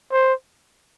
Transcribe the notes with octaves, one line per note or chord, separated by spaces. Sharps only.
C5